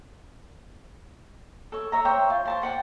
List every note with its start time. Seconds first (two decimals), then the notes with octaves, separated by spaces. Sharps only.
1.72 A4 C#5
1.92 C#5 E5 A#5
2.05 C5 C#5 E5 G5
2.30 F4
2.45 C5 A5 C6
2.62 C5 F#5 G5 A5